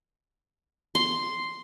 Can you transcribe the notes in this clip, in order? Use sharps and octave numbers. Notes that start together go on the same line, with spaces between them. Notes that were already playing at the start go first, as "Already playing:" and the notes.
C6